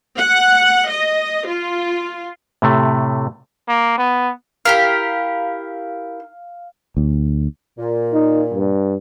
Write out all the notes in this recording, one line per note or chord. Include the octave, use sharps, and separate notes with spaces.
F#5
D#5
F4
A2 C3 A3
A#3
B3
E4 G4 A#4 F5
D2
A#2
D#4
G2